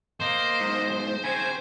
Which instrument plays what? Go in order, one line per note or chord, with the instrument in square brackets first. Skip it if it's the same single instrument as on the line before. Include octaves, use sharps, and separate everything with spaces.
[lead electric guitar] A#3 [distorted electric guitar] C5 [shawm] D#5
[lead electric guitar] B1 G#2
[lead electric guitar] C#3 C4 [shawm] G#5